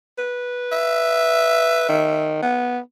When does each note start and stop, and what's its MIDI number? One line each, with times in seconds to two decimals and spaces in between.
0.18 1.86 71
0.72 2.27 76
1.89 2.38 51
2.43 2.79 59